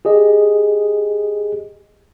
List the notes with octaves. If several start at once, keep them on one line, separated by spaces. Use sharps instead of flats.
G4 G#4 D#5